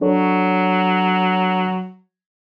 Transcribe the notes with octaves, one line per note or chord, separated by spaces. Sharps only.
F#3 D4 A4 C#5